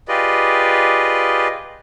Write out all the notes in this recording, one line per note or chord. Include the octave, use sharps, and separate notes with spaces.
F4 G4 G#4 B4 D5 D#5